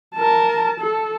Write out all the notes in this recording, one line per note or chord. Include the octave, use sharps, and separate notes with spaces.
A#4 A5
A4